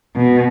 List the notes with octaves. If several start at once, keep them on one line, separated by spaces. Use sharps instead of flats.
B2